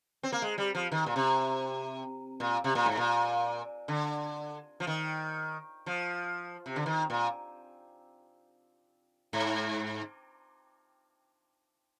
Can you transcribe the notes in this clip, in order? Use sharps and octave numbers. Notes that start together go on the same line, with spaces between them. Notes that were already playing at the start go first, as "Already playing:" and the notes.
C4
A#3
G#3
G3
F3
D#3
A#2
C3
A#2
C3
A#2
G#2
A#2
D3
F3
D#3
F3
C3
D3
D#3
A#2
G#2